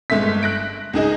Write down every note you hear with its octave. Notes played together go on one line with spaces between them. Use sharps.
G1 G#3 A3 E5 B6
F#6 A#6 D7
C#2 D#4 G#4 D#5